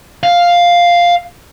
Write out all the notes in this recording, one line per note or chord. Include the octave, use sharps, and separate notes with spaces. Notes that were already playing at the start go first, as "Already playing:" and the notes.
F5